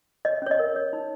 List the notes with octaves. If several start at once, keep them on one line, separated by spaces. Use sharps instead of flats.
C#5 D#5
C#4 C#5
D#5
A#4
C#5
D#4